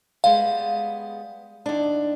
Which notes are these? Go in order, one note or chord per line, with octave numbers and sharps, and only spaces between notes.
G3 G#3 B3 F5
D#2 D4